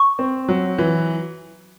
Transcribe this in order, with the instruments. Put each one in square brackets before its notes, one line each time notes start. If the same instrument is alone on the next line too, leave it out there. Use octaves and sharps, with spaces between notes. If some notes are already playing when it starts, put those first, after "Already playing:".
Already playing: [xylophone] C#6
[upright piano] C4
F#3
E3